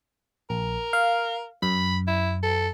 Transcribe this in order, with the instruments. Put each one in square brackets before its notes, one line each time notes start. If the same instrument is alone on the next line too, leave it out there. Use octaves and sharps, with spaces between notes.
[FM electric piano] A#1 [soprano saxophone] A#4
[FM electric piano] F5
[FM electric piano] F#2 [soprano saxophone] B5
[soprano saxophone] E4
A4